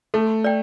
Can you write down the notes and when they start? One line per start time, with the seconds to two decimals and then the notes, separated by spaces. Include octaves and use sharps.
0.14 A3 A4
0.44 D5 G5